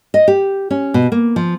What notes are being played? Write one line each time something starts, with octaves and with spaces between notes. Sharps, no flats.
D#5
G4
C#4
B2
A#3
F3